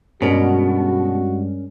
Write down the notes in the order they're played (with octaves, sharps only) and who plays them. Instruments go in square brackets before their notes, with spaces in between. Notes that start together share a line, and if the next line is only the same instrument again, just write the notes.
[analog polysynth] G2 G3 G#3 [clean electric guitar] B2 [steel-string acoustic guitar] C#4 A#4 [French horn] F#4